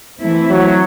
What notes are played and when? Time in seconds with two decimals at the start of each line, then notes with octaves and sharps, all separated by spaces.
0.20 E3 A3 C4 E4
0.50 F#3